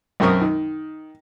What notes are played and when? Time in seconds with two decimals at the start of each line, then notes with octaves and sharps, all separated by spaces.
0.20 B1 F#2 C4 A#4 C#6 D#6
0.41 D#3